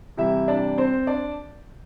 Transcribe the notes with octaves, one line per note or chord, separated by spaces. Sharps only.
C3 E3 G3 E4 E5
D4 D5
C4 C5
D4 D5